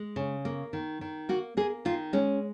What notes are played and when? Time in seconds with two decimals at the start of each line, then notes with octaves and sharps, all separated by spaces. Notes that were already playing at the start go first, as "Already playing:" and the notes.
Already playing: G#3
0.16 C#3
0.45 A#3
0.73 D#3
1.01 D#3
1.29 A#3 F#4
1.57 A#3 G#4
1.85 D#3 F4
2.13 G#3 C#4